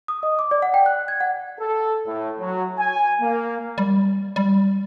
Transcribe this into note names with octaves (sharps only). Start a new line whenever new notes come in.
D#6
D#5
D6
D5
F#5
G5
F#6
G#6
F#5
A4
A2
F#3
G#5
A#3
G3
G3